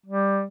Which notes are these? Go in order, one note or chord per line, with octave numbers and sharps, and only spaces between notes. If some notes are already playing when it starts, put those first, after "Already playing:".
G3